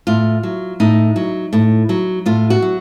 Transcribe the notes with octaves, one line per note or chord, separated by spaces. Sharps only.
A2 F4
F#3
A2 D#4
F#3
A2
F#3
A2 F4
F#4
F#3